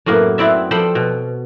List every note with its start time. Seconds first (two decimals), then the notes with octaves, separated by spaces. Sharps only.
0.06 F#2 A2 A#3 B3
0.38 B3 C4 E4 D5 E5
0.71 F3 A4 C5 D5 G5 B5
0.95 B2